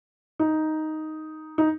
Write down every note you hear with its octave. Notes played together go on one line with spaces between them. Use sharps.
D#4
D#4